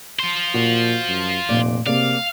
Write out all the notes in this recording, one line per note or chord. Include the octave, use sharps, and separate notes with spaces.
F4 C5
A#2 F#4
F#2
F1 A#2 D5
C3 A#3 G#4 D5 F5